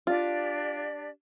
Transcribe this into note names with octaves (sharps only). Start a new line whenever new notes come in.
D4 F4 G4 D5